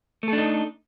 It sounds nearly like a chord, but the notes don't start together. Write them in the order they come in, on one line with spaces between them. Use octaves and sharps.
A3 A4 D4 D#4